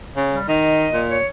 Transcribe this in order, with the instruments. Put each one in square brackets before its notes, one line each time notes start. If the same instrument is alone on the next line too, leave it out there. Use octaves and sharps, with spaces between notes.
[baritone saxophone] C#3
[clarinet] G3
[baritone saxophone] D#3 [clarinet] D#5
[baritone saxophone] A#2
[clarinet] C#5